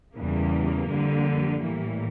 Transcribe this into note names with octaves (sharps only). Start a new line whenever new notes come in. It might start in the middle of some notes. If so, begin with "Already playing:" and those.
E2 C#3 E3 G3 A#3
F2 D3 G3
A2 E3 G3 A#3